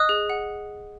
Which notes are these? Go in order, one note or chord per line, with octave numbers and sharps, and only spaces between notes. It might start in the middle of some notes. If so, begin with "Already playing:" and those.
Already playing: D#5 D#6 F#6
G#4
F#5